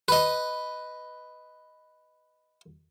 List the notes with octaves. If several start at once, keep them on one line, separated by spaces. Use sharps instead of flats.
B4 D#5